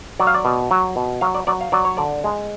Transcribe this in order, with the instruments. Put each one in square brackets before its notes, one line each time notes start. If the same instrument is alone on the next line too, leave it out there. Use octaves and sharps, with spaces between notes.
[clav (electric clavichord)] F#3 D5
F5
D5
B2
F#3
B2
F#3 F5
D5
F#3 D5
F5
F#3 D5
C#5
D3 D5
G#3